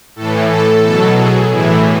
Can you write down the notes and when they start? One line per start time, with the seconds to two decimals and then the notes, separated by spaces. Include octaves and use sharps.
0.16 A2 E3 A4
0.50 A4
0.83 B2 F#3 A4
1.16 G#4
1.50 A2 E3 E4